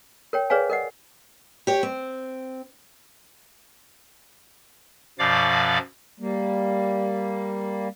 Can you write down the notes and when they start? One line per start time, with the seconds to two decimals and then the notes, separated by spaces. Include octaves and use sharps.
0.33 A#4 C#5 G5
0.50 G#4 B4 C#5 D5 F5 G#5
0.70 A#4 D#5 F#5
1.67 G4 C#5
1.83 C4
5.19 F#2 B2 F3 D5 F5 D6
6.20 G3 A#3